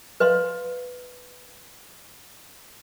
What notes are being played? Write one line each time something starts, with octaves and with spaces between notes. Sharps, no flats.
B4 D#5 F5 C6